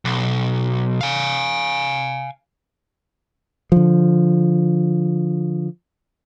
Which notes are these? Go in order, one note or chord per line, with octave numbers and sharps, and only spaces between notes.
B1
F5 G#5
D3 F3